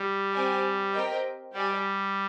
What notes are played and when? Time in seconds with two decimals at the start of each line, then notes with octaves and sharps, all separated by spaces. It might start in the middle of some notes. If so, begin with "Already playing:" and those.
Already playing: G3
0.33 C4 G4 D5 G#5
0.93 C4 G4 A#4 D#5 G5
1.53 G3 G4 D5 G#5